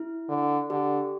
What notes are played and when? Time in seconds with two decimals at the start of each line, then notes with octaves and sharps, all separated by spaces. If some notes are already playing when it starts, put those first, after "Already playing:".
Already playing: E4
0.29 D3
0.70 D3 G4